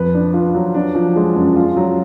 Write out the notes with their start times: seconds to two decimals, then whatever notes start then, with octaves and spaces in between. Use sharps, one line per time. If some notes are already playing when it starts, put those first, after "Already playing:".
Already playing: F2 B4
0.14 D4
0.34 F4
0.55 F#3
0.75 D4
0.95 F3
1.16 G#3
1.36 F#2
1.56 F4
1.76 F#3